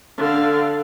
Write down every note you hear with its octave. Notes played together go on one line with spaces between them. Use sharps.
D3 F5